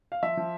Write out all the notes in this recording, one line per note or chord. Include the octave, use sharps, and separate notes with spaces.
F5
F3 E5
F3